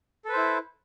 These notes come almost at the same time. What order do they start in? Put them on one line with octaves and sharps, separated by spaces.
A4 B4 C5 E4